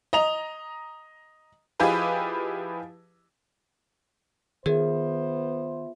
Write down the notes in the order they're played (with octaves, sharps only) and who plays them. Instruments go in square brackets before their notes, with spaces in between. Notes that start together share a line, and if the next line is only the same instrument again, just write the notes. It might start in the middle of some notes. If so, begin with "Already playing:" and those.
[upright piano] D#5 A#5 F7
[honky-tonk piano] F3 E4 G4 G#4 B4 D#5
[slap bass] D#3 [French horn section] B3 C5 [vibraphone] F4 E5 [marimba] G#4